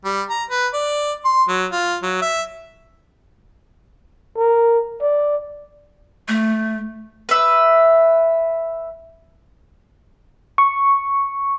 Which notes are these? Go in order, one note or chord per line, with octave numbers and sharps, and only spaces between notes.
G3
A#5
B4
D5
C6
F#3
F4
F#3
E5
A#4
D5
A3
B4 E5
C#6